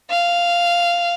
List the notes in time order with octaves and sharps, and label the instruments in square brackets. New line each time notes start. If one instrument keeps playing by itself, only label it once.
[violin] F5